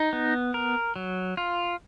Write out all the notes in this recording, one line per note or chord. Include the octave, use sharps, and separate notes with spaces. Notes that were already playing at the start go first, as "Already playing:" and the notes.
Already playing: D#4
B3
A#4
F#3
F4